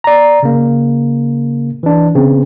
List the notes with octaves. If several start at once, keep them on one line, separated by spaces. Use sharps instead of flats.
D5 A#5
C#3 A#3
E3 D4
C#3 B3 C4